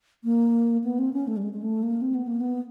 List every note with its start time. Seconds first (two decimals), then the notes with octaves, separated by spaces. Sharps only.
0.24 A#3
0.84 B3
0.99 C4
1.13 C#4
1.28 A3
1.37 G3
1.43 G#3
1.53 G#3
1.63 A3
1.83 A#3
2.02 C4
2.15 B3
2.28 A#3
2.41 B3